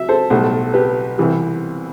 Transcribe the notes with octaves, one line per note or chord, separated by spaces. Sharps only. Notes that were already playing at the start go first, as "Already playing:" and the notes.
Already playing: F#3 E5
A4 C5
B1 A2 G3
G4 B4
C2 C3 E3 G3